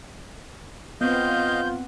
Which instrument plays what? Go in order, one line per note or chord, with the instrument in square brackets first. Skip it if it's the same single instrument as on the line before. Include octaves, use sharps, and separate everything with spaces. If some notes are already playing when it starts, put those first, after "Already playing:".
[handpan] B3 C4 [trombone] F4 [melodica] D#5 F5 [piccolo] G6